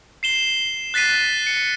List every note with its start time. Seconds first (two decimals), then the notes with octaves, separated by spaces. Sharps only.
0.23 C7 E7 G7
0.94 F#6 A6 B6 C7 D#7
1.47 C#7